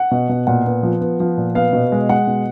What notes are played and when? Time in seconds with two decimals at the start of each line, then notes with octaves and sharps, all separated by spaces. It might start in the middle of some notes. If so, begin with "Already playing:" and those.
Already playing: F#5
0.11 B2
0.29 B2
0.47 A#2 F#5
0.66 B3
0.83 F3
1.01 B3
1.20 F3
1.38 A#2
1.55 B3 F5
1.73 B2
1.92 G#3
2.09 G#3 F#5
2.27 B2